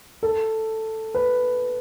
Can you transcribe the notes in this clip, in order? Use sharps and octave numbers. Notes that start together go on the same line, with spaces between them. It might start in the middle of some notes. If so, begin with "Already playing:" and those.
A4
B4